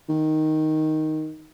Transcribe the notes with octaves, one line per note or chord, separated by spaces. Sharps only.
D#3